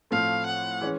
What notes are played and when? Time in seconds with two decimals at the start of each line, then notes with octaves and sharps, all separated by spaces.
0.11 A2 F3 A3 C4 F5
0.46 F#5
0.81 E3 G#3 C#4